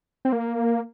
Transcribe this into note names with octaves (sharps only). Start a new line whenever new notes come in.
C4
A#3